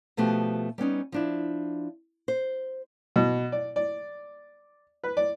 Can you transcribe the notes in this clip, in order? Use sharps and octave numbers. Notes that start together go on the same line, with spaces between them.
B2 F3 A3 B3 F#4 G4
G3 B3 C#4 D#4
F3 D4 E4
C5
B2
D5
D5
B4
D5